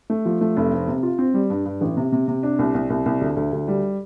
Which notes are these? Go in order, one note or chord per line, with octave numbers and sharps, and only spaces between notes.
A3
F3
A3
F1
C4
C3
F4
C4
G3
G2
G2
A1
C3
C3
C3
D4
C2
C2
C2
C2
D2
D2
D2
G3